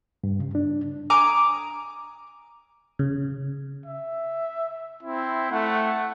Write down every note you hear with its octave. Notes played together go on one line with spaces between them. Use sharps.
G2
C#3
D4
G#5 A#5 D6 D#6
C#3
E5
C4 E4
A3 F#5